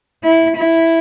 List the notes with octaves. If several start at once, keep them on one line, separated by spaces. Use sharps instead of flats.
E4
E4